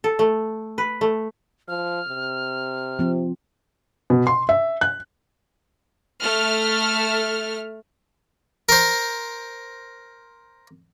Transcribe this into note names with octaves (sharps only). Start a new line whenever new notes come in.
A4
A3
B4
A3
F3 F6
C3
F3 C4
B2
C6
E5
F#6
A3 F6
A#4 C5